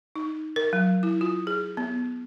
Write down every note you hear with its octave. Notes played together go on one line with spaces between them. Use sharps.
D#4
A#4
F#3
E4
F4
G#4
B3